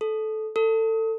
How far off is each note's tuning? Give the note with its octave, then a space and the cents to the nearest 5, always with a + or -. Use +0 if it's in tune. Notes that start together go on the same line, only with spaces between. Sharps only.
A4 -15
A4 +25